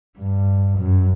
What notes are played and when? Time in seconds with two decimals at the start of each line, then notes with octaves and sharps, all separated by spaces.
0.18 G2
0.78 F#2